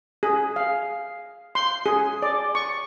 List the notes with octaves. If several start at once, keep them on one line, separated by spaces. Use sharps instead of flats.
G#4
F5
C6
G#4
D5
C#6